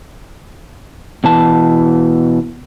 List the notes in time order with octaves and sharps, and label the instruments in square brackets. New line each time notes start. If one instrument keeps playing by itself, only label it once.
[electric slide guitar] B2 E3 A5